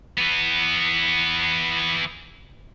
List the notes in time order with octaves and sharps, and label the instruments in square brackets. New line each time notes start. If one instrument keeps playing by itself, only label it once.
[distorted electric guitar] E3 B3